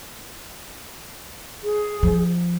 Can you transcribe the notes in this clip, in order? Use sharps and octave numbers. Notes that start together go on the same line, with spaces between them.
G#4
F3